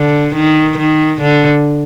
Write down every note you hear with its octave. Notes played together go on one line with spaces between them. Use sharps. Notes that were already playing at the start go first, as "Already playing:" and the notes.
Already playing: D3
D#3
D#3
D3